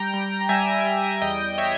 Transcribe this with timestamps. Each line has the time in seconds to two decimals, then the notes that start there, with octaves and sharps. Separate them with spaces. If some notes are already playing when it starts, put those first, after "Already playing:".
Already playing: G3 G5 A#5
0.14 G3
0.41 A#5
0.49 G3 E5 G#5
0.85 G3
1.21 E2 D#5 G5
1.54 D#5
1.58 C#5 E5